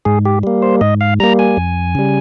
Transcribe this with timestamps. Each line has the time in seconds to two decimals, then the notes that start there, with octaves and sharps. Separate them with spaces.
0.05 G#2 G#4
0.25 G4
0.43 G3 A#3
0.62 C5
0.81 G#2 D#5
1.01 F5
1.20 G3 A#3 A#5
1.39 G#5
1.57 F2
1.95 C#3 G3